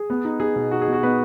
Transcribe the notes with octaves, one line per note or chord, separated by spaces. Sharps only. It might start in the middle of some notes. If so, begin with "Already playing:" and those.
Already playing: G#4
B3
D#4
D#4 G#4
B2
D#4 F#4
G#4
B2 F#4
B3 B4